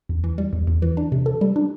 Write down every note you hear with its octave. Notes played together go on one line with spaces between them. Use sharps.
E2
E3
G3
E2
E2
E3
D4
C3
A4
G3
D4